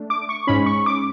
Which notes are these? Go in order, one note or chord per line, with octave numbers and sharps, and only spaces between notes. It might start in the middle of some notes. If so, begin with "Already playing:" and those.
Already playing: A3 D4
D6
C#6
G#2 G#3 C#4 B5
C#6
D6